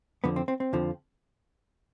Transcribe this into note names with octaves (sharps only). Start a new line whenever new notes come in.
F2 D3 F3 B3
C4
C4
C4
F2 D3 F3